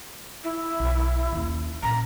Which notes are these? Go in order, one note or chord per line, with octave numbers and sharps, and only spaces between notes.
E4
B1
D#2 C#4
A#2 C#4 A#5